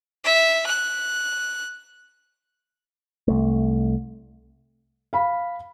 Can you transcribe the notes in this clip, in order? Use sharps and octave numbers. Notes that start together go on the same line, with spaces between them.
E5
F#6
C2 A3
F5 B5